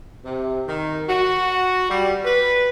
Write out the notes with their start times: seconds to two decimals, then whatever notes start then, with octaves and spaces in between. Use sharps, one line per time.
0.25 C3
0.67 D#3
1.08 F#4
1.90 G3
2.24 B4